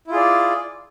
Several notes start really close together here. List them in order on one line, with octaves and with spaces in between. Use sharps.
E4 F4 G#4 D5